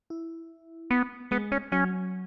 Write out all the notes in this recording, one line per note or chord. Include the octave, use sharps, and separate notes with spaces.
E4
B3
G#3 B3
C#4
F#3 C#4